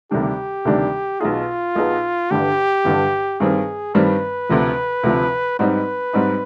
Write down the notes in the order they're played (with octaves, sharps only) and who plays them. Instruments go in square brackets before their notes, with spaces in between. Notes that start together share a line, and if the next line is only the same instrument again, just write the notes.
[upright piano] D2 C3 D#3 G3 D4 [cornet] G4
[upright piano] D2 C3 D#3 G3 D4
[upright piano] B1 B2 B3 D#4 G#4 [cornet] F4
[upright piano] B1 B2 B3 D#4 G#4
[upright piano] G1 G2 D3 [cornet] G4
[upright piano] G1 G2 D3
[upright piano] G2 D#3 G3 C4 [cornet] G#4
[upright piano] G2 D#3 G3 C4 [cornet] B4
[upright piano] D2 C3 F3
D2 C3 F3
[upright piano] G#2 G3 C4 D#4 [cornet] B4
[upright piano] G#2 G3 C4 D#4